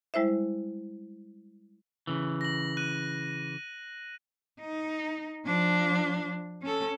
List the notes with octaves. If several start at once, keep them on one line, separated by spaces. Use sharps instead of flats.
G3 G#3 E4 C5 E5
C#3 E3
A#6 F#7
F#6 D#7
D#4
F3 D4
C#4 A4